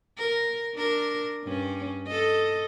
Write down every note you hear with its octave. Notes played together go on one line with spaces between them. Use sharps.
A#4
D4 A#4
G2 C#4
A4 D#5